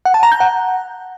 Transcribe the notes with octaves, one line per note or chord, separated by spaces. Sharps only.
F#5
A5
A#5
G6
F#5